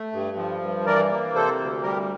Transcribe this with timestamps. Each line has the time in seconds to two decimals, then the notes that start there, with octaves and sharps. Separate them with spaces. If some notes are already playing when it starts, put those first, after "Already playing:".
Already playing: A3
0.13 G2
0.37 F3
0.62 G2
0.86 E3 A#4 D5
1.11 A#3
1.34 C3 A4 C5
1.60 D2
1.83 G3 G4 A#4